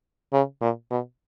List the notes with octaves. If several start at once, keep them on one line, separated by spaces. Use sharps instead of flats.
C#3
A#2
B2